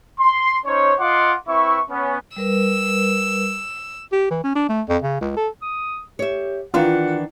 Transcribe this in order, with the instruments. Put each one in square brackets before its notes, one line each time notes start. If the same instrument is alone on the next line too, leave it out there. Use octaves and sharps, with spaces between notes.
[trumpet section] C6
C#4 D#4 C5 C#5
F4 D#5 F5 F#5 C6 D6
C4 E4 B4 E5 C#6
B3 C#4
[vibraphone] G3 A#4 B4 [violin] E6
[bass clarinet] G4
E3
C#4
D4
A3
F2
C#3
C#2
A4
[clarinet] D#6
[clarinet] G4 [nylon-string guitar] C#5 E5
[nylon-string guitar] D#3 E3 D4 [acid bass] F4 [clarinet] F#5